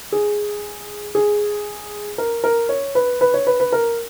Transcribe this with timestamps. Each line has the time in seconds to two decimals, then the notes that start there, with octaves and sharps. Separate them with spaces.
0.12 G#4
1.15 G#4
2.18 A#4
2.44 A#4
2.69 C#5
2.95 B4
3.21 B4
3.34 C#5
3.47 B4
3.60 B4
3.73 A#4